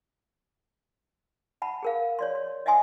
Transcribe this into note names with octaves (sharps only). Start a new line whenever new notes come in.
F#5 A5 B5
G#4 A#4 F5
C#5 D5 C6
C6
D#5 E5 F#5 G#5 C6 D#6